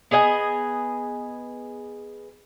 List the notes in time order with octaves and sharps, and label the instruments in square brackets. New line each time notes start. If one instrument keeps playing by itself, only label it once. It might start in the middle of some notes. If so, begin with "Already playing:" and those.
[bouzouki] B3 G#4 D#5 G#5